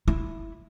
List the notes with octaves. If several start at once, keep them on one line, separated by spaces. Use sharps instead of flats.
E4